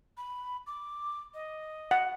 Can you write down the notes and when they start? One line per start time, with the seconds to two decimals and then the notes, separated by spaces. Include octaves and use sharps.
0.17 B5
0.67 D6
1.34 D#5
1.91 F#5